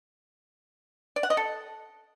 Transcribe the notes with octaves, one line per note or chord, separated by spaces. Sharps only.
D5
F#5
D#5
A4